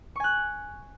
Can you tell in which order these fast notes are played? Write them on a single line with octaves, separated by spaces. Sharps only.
C#6 G#5 F#6